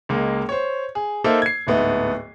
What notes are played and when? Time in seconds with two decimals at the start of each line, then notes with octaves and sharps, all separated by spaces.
0.09 C#2 G#3 A#3
0.49 C5 C#5
0.95 G#4
1.24 A#3 D#4 A4 C5 E5
1.42 G#6 C7
1.67 D1 G#2 A3 B3 D#5